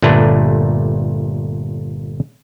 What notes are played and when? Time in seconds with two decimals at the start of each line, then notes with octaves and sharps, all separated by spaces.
0.02 G1 A#2 A3 D4 B4 A#5